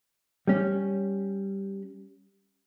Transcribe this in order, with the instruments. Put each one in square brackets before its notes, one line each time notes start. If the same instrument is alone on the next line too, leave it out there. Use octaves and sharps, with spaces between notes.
[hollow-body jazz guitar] G3 C#4